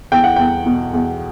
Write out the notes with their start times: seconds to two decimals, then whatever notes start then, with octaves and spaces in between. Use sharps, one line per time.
0.12 E2 G5
0.24 F#5
0.36 E2 G5
0.66 B2
0.94 E2